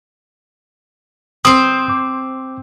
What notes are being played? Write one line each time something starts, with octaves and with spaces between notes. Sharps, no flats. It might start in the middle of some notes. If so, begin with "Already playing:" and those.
C4 C5 C6 D#6
D6